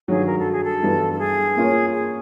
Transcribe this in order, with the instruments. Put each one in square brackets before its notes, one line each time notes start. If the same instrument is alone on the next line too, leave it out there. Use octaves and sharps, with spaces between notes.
[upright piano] G2 D#3 F#3 [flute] G#4
[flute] A#4
A4
G#4
A4
[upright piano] G2 E3 G3 B3
[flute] A4
G#4
[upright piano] A#3 C#4 F4 A#4 C#5
[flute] G#4